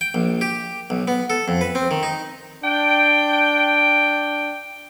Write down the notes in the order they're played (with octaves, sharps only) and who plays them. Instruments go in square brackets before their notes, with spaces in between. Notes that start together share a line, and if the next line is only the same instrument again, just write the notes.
[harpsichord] G5
A#1
G4
B1
B3
A4
F2
B4
C4
D#3
D#4
[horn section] D4 G5